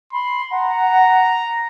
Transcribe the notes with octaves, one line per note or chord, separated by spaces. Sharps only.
B5 C6
F#5 A#5